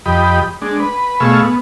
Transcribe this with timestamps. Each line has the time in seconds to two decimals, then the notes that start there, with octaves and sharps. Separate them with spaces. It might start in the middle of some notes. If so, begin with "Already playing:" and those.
0.06 F2 G4 D#5 B5
0.62 G#3 D4
0.80 B4
1.20 B2 A3 G#4 F5 C#6 E6
1.40 B3